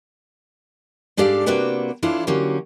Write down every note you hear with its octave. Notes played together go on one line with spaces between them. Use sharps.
G#2 D4 G4 A4 D5 F5
C3 A#3 D4 F#4 B4 G5
E3 D4 E4 F4 A4 C#5
D3 F#3 A#3 C#4 F#4 G4